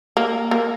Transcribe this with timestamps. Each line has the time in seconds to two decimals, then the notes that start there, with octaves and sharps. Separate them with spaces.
0.17 A#3
0.51 A#3